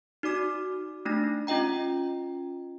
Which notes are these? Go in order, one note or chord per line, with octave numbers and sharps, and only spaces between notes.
D#4 F#4 D5 D6 F6
A3 D4 D#4 A#6
C#4 F4 D#5 G5 A#5